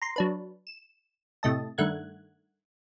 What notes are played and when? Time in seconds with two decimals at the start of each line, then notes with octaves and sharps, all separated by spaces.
0.02 A#5 C6
0.16 F#3 D4 B4
0.67 E7
1.43 A2 C3 A3 D#5 A5
1.78 G2 D#3 A3 F#5 F#6 G#6